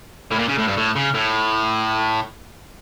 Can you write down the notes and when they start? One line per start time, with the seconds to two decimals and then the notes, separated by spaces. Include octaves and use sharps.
0.32 A2
0.39 A#2
0.49 C#3
0.58 A2
0.68 G2
0.77 A2
0.96 C#3
1.15 A2